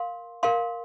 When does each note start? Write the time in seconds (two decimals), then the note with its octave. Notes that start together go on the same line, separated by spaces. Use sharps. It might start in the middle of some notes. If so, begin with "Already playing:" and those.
Already playing: A#4 F5 C6
0.43 A#4 F5 C6